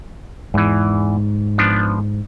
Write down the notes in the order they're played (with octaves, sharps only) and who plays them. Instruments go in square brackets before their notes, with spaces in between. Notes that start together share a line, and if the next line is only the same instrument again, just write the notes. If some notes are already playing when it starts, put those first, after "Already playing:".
[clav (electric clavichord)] E2 E3 [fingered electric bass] G#2
[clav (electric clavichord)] F3 B3 D4